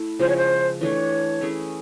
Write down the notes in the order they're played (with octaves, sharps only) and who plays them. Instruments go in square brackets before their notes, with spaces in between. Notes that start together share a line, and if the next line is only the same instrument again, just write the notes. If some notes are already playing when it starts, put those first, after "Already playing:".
Already playing: [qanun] A3 E4
[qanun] C#3 F3 G#3 C#4 [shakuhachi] C5
[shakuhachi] C#5
C5
[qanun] E3 A3 D4 [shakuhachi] C#5
[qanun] A3 C#4 E4 G#4